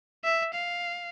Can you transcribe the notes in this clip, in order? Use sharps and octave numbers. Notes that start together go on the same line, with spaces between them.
E5
F5